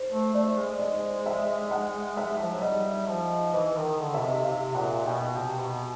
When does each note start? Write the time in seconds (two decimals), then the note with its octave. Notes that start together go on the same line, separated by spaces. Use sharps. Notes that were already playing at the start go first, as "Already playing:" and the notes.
Already playing: C5
0.11 A3
0.34 A3 D5
0.57 G#3
0.79 D#5
1.26 E5
1.71 F#5
2.17 E5
2.39 F3
2.51 F#3
2.62 G3 D#5
3.08 F3
3.53 E3 D#5
3.76 D#3
3.99 D3
4.14 B2 E5
4.22 C3
4.44 C3 F5
4.75 A#2 F#5
5.06 B2 G5
5.35 C3 G5
5.59 B2